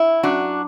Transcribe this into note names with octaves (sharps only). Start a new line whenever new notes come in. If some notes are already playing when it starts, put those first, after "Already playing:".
Already playing: E4
F#2 D4 F#4